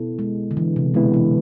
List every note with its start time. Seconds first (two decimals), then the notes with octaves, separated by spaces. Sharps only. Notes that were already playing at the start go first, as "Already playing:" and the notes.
Already playing: B2 B3 E4 A4
0.19 G#3
0.51 D3
0.57 E3
0.76 C3
0.94 B2 D3 G#3 B3 E4 B4
1.14 E3